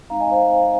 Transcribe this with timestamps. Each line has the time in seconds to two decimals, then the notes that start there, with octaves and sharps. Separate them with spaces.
0.10 G#3 C4 D#4 F5 A#5
0.21 D#5 G#5
0.31 C5 F5